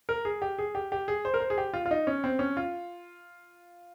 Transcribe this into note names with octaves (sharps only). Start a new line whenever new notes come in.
A#4
G#4
G4
G#4
G4
G4
G#4
C5
A#4
C5
G#4
G4
F4
F4
D#4
C#4
C4
C#4
F4